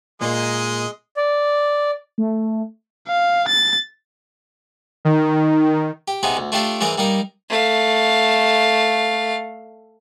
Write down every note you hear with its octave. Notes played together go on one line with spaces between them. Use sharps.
A#2 G#3 A#3 D#5
D5
A3
F5
A6
D#3
G4
C3 B3 D#4 G#4
D2
A3 D4 F4 G4 C5 D5
G#2 E3 G#3 A#4 D5 D#6
G3 A#3 D#4 A#4
A3 F5